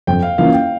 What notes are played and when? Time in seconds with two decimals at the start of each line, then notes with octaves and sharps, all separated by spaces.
0.07 F2 G5
0.23 F5
0.38 E3 A#3 C#4 F4 F5
0.53 G5